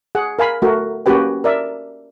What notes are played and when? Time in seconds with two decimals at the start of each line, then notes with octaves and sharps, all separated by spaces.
0.15 G#4 F#5
0.39 A#4 F5 G#5 B5
0.62 A3 F#4 A#4
1.06 A#3 C#4 F#4 G4 B4 G5
1.44 A#4 D5 E5